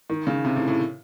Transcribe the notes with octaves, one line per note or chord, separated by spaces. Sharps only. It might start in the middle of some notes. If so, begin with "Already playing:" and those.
D#3
C#3
C3
A2
A2